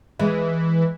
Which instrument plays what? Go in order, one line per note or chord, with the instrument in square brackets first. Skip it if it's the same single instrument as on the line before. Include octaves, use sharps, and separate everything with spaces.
[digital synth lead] E3 [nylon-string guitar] G#3